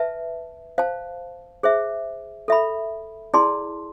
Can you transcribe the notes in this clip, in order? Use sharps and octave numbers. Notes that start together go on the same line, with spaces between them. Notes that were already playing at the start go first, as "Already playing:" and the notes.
Already playing: B4 E5 A5
C5 F5 A5
G#4 C5 E5
A4 E5 B5
E4 G#4 D5 A5 C6